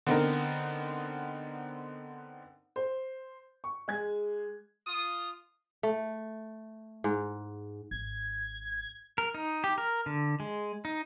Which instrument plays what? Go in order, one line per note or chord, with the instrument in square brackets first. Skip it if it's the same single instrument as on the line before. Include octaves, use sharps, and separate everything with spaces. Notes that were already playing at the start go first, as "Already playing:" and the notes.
[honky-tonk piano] D3 B3 C4 D#4 A#4
[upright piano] C5
C#6
G#3 G#4 G#6
[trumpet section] F4 D#6
[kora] A3
G#2
[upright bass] G#1 [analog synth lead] G#6
[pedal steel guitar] A#4
D#4
G4
A#4
D3
G#3
D#4